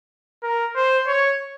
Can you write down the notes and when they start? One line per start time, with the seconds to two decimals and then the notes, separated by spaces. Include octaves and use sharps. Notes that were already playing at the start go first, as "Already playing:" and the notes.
0.43 A#4
0.76 C5
1.07 C#5